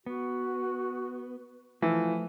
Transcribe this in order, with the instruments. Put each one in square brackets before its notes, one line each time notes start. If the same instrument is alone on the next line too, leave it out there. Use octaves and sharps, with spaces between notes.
[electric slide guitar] B3 [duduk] F#4
[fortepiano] E3 [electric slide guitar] F3 A3 A4 [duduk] F4